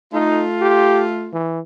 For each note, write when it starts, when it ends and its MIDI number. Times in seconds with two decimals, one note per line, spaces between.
0.13 1.34 57
0.13 0.45 63
0.13 1.34 65
0.61 1.05 67
1.33 1.60 52